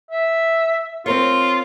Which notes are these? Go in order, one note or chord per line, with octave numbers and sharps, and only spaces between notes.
E5
C4 F4 A#4 C#5